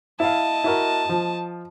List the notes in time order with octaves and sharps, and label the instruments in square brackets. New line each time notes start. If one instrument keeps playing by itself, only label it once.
[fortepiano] E4 F5 [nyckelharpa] D#5 A5
[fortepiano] E4 F#4 A#4
F3